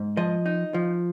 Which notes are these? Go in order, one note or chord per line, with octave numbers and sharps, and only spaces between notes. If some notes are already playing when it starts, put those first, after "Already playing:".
Already playing: G#2
F3 D#5
D#4
F3